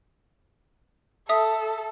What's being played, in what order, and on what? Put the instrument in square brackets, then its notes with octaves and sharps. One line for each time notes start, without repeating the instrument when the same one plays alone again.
[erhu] A4 [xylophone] E5 D#6